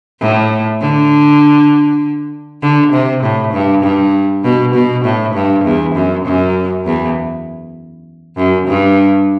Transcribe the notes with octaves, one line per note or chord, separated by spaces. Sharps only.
A2
D3
D3
C3
A2
G2
G2
B2
B2
A2
G2
E2
F#2
F#2
E2
F#2
G2